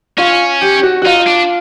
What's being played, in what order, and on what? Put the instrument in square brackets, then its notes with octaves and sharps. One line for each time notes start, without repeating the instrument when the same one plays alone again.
[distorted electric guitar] C#4 [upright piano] F4
[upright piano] G4
G4
F#4
F#4
[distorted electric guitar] D#4 [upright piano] F4
[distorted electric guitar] D4